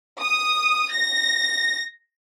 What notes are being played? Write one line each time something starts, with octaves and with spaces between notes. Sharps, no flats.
D#6
A#6